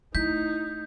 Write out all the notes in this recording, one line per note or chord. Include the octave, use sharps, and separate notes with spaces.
A3 D#4 E4 G6 B6